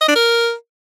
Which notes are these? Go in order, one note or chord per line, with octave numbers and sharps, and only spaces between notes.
D#5
D4
A#4